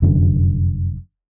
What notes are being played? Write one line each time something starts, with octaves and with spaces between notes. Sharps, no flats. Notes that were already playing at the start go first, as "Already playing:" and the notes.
F1 F#2 D3